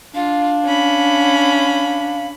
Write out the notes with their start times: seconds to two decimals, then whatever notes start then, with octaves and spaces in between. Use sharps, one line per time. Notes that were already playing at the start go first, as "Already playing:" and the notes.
0.15 D4 F4 F5
0.65 C#4 B5